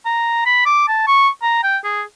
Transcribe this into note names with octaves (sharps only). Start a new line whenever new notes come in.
A#5
B5
D6
A5
C#6
A#5
G5
G#4